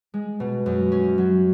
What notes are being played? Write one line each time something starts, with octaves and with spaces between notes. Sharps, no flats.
G#3
B2
F#2
C#4
F#3